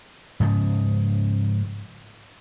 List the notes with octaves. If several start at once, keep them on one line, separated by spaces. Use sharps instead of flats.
G#2 C#3 F3